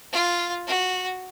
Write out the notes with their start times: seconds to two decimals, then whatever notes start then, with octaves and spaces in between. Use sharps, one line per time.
0.13 F4
0.68 F#4